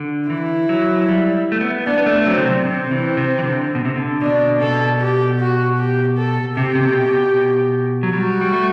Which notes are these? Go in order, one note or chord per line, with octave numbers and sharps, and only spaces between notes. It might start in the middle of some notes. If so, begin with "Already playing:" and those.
Already playing: D3
E3 E4
F#3
G3
A3
B3
B3 D4
B3
A3
F#3 C4
D3
C3
C3 C4
E3
C3
E3
D3
B2
C3
D3
B2 D4
B2 A4
G4
F#4
G4
A4
C3 G4
C3
B2
B2
F#3
G3 F#4
G3
A3